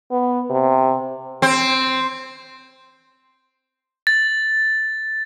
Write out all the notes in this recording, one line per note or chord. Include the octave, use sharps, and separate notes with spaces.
B3
C3
C4
A6